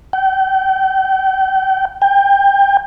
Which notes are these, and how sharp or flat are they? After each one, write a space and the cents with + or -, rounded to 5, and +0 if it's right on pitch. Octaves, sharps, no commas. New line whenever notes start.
G5 -35
G5 +25